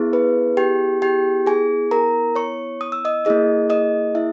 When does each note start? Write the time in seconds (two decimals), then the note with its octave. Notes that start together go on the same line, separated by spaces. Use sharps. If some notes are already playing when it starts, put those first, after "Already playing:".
Already playing: B3 E4 G#4
0.13 B4
0.57 G4 G5
1.02 G4 G5
1.47 G#4 G#5
1.91 A#4 A#5
2.35 C#5 C#6
2.81 D#6
2.92 E6
3.05 D#5 D#6
3.25 A#3 E4 G#4 D#5 D#6
3.70 D#5 D#6
4.15 E4 E5